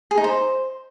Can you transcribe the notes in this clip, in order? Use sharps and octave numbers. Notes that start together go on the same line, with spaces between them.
G#4
D#4
C5